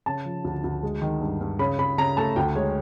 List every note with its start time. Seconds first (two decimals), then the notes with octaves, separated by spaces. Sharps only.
0.06 C#3 A5
0.25 F3
0.44 D2
0.64 D2
0.83 G#3
1.02 D#3
1.21 G2
1.41 G2
1.59 C#3 B5
1.79 C#3 B5
1.98 C#3 A#5
2.17 A3 A5
2.36 D2 G5
2.55 G#3 C#5